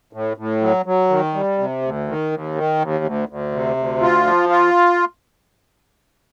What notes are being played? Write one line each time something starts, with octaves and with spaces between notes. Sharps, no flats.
A2
A2
F#3
F#3
D#3
G3
C3
D2
D#3
D#2
D#3
D#2
D2
D2
C3
D2
F4
F3
F4